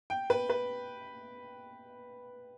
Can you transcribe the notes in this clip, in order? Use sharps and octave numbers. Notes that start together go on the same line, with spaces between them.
G5
B4
B4